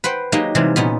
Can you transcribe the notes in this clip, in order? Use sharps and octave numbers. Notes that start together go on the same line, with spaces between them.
B4 C5 F#5 G5
F#3 G#3 A#3 D#4 G4
C3 E3 G3 G#3
A#2 B3 C#4 D#4